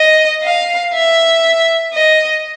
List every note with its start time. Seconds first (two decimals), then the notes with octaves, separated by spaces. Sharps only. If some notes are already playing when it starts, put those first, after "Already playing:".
Already playing: D#5
0.43 F5
0.94 E5
1.93 D#5